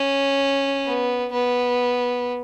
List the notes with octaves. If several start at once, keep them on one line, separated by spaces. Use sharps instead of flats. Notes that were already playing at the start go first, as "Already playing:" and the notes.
Already playing: C#4
B3
B3